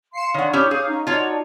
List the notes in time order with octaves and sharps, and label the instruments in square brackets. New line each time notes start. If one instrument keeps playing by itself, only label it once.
[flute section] F5 C6 [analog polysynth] C7 C#7 E7
[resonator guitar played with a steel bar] D#3 F#5 [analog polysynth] D4 C#5
[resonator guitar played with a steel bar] C#4 E4 G4 [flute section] D6 D#6 G6
[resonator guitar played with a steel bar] G#4 [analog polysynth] C#5 F5
[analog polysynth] C#4 D#4 [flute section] F5 A#5
[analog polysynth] D#4 F#4 D5 [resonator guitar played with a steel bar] F4 C#5 [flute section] A5